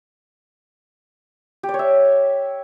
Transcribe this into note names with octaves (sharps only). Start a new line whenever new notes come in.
G4
D5
C#5
E5